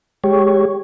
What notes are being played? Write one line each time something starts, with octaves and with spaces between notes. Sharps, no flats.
G#3 G4 C#5